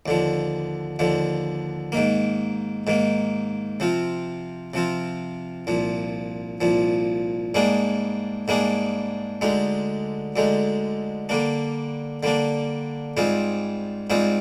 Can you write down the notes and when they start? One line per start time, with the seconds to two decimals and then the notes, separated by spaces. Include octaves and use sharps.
0.06 D#2 D3 F3
0.99 D#2 D3 F3
1.92 G#2 D#3 A#3
2.87 G#2 D#3 A#3
3.80 C3 F3 C4 F4
4.74 C3 F3 C4 F4
5.67 C2 A#2 F3
6.61 C2 A#2 F3
7.54 G#2 G3 A#3 D4 G#4
8.48 G#2 G3 A#3 D4 G#4
9.41 D2 D3 G#3 D#4
10.36 D2 D3 G#3 D#4
11.29 D3 G3 A#3 D4
12.23 D3 G3 A#3 D4
13.17 G#2 G3 C4 F4 G#4
14.10 G#2 G3 C4 F4 G#4